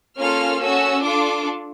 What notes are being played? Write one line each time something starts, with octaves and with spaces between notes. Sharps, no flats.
A#3 C#4 F4 A4 F6
C#4 F#4 A4 E6
D4 F4 A4 D6